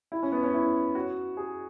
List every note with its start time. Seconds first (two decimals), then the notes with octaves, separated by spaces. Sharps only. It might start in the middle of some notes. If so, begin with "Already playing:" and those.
0.12 E4
0.23 C#4
0.32 B3
0.43 C#4
0.54 E4
0.95 F#4
1.37 G#4